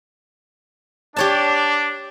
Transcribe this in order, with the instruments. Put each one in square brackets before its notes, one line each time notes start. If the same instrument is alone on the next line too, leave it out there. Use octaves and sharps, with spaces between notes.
[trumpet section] D4 [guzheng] G4 C#5 A5